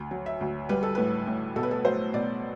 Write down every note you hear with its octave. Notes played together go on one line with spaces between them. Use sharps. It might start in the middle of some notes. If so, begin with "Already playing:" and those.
Already playing: D2
F#3
E5
D2
G3 B4
A4
A2 B4
A2
B2 A4
B4
A4
F#3 C5
B2 D5